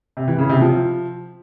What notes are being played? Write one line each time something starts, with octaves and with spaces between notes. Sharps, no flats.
C3
E3
C#3
C3
F3